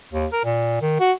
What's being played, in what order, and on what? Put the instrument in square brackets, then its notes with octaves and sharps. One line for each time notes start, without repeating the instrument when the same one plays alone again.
[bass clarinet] D#2
A#4
A#2
D#3
F#4